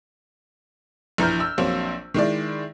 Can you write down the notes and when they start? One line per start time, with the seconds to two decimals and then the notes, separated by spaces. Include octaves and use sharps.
1.18 A#1 E3 A#5 F6 G6
1.40 E6
1.58 A#1 F#3 A#3 C4 C5 C#5
2.14 D#3 G#3 E4 D5